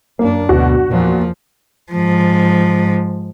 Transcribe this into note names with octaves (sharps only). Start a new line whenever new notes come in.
F#2 A#3 D4
D2 B2 F#4
E2 A#2 F3
G#2 F3